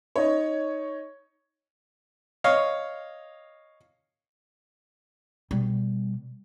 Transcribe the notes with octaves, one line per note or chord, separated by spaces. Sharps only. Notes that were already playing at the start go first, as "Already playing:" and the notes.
D#4 C#5
C#5 D#5 F5
B2 G3